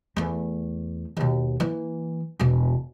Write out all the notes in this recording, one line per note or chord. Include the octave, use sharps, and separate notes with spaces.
E2 A3
D#2 B2
E3 A#3
E1 B2